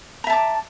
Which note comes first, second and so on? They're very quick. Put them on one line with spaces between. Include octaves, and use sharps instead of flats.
A#5 E5 A5 D6